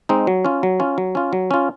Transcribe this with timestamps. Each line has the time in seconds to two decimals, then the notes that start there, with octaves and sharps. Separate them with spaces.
0.09 G#3 C4 D#4
0.27 F#3
0.45 C#4 F4
0.63 F#3
0.80 C#4 F4
0.98 F#3
1.15 C#4 F4
1.33 F#3
1.51 C#4 F4